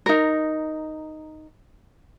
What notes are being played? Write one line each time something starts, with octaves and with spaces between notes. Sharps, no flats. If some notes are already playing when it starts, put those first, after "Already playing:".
D#4 A#4